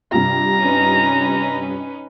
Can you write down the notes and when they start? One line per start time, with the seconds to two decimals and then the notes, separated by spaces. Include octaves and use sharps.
0.12 G2 C3 F4 A#5
0.62 C#4 D#4 B4